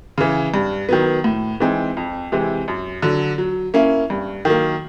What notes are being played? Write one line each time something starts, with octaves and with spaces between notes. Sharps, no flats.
C#3 E3
G2
D#3 F#3 B3
A2
E3 G#3 C4 D#4
F2
C3 E3 G#3 C4
F#2
D3 F#3
F#3
A#3 C#4 E4
G2
D#3 F#3 A#3